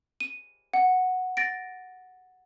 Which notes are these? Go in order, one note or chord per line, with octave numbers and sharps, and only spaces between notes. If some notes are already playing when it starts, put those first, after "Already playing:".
D#7
F#5
A6 A#6 D7